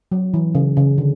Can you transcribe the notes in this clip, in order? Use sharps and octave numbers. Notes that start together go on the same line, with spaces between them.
F#3
E3
C#3
C#3
D3